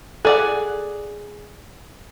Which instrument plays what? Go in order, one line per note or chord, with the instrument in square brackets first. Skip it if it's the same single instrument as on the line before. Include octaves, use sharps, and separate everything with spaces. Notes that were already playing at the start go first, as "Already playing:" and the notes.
[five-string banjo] G#4 D5 F#5 [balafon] A4